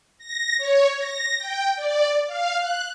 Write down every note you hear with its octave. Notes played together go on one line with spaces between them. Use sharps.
A#6
C#5
A#6
G5
D5
F5
F#6